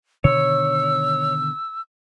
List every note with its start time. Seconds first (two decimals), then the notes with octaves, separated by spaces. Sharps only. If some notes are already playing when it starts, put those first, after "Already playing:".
0.24 B2 D3 D#3 C#5 E6